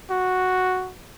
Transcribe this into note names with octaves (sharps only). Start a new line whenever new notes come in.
F#4